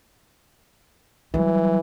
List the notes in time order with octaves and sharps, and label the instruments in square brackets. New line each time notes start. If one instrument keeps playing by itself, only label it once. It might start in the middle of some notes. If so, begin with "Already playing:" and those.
[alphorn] E3 [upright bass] F#3 G3